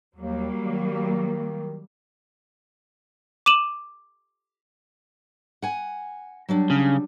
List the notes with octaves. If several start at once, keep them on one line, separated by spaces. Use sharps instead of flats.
D#2 F#3 G3 A#3
D#3
D6 D#7 E7 F#7
F#5 G#5
F#3 G3 D4
C#3